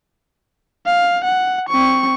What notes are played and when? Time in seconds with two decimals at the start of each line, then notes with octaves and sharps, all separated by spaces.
0.86 F5
1.24 F#5
1.69 C4 C#6